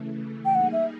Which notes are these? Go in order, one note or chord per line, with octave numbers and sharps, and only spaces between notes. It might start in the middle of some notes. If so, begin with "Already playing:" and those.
Already playing: C#3 E3 A3
G5
G3 A#3 D#4 G#4 F#5
E5